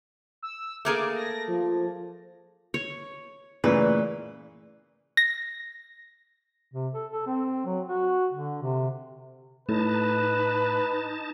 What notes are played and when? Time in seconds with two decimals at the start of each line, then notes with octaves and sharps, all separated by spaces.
0.43 E6
0.85 A3 A#3 G#4 D6
1.16 A#6
1.48 F3
2.74 C#5
3.64 A#2 C#3 E3 A3 B4 D5
5.17 A#6
6.73 C3
6.94 A4
7.11 A4
7.27 C4
7.66 F#3
7.88 F#4
8.33 D3
8.63 C3
9.69 A2 D#4 B4 A5